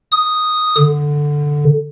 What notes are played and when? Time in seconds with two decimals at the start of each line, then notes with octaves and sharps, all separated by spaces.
0.12 D#6
0.78 D3